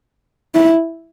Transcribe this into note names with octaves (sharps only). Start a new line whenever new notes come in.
E4